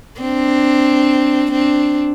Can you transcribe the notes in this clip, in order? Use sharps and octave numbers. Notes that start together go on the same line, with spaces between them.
C4 D4
C4 D4